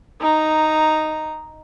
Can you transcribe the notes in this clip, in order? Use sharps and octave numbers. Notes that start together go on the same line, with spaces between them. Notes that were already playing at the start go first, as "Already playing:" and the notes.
D#4 A#5